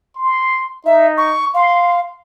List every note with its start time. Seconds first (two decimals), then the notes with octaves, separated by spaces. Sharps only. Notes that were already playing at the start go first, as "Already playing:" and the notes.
0.16 C6
0.86 D#4 E5
1.17 C#6
1.54 F5 C6